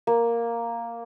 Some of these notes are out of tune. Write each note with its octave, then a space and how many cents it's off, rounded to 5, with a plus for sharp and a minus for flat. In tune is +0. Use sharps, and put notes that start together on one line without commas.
A#3 +0